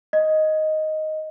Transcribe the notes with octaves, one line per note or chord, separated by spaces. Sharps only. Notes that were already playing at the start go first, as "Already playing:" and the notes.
D#5